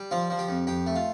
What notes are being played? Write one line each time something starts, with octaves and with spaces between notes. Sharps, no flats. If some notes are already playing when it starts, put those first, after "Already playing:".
Already playing: G3
F3 F4
F3
G4
F2
F2 G4
A3
F4